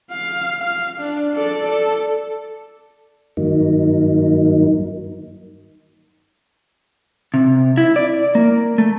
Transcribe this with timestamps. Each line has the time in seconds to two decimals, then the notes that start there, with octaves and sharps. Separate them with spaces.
0.11 F5
0.60 F5
1.00 D4
1.34 A4 D5
1.69 A4
3.37 G2 D#3 F#3 A#3 D#4
7.34 C3
7.77 E4
7.96 D5
8.35 A#3
8.78 A3